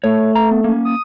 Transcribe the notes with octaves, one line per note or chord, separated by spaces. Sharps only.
A3 C#5
A#5
B3
A#3 C#4
D#6